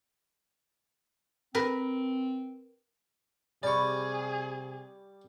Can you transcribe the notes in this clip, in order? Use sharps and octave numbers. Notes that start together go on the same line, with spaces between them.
C4 A#4 B4
C3 G3 G#4 D5 C#6